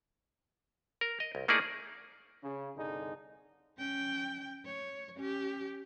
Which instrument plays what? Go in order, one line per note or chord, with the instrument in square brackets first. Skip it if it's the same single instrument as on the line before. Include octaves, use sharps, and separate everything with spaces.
[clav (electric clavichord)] A#4
D#5
C2
A3 A#3 D#4 E4 G#4 D5
[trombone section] C#3
C2 G2 D3 D#4 G#4
[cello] C#4 G5
C#5
C#4 G4